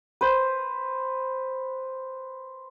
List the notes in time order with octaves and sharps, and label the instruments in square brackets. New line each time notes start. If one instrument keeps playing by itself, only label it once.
[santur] B4 C5